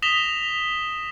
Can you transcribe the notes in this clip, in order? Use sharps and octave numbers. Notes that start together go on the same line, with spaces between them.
D#6 A#6 B6 E7 F7 G7